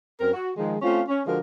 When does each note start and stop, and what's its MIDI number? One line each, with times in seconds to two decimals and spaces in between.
0.21 0.30 42
0.21 0.30 60
0.21 0.30 70
0.34 0.50 66
0.57 0.76 51
0.57 0.76 53
0.57 0.76 56
0.82 1.01 57
0.82 1.01 60
0.82 1.01 61
0.82 1.01 65
1.08 1.21 61
1.27 1.38 50
1.27 1.38 53
1.27 1.38 56
1.27 1.38 66
1.27 1.38 70